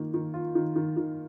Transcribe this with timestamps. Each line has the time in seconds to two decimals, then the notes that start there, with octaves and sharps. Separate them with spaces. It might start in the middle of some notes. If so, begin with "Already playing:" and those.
Already playing: D#3 A#3
0.14 D#3
0.34 F4
0.55 D#3
0.76 D#3
0.97 D#3